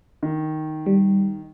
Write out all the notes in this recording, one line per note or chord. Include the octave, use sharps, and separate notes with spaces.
D#3
G3